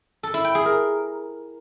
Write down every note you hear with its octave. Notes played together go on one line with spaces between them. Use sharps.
A4
E4
G5
G#4
A#4